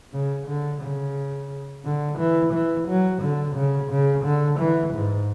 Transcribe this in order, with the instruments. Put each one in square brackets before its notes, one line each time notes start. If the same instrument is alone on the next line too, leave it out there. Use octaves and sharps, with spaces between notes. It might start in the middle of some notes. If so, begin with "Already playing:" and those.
[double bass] C#3
D3
C#3
D3
E3
E3
F#3
D3
C#3
C#3
D3
E3
G#2